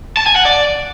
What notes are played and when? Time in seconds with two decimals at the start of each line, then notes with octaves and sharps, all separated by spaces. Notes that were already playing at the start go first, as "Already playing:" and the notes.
0.17 A5
0.27 G#5
0.36 F#5
0.45 D5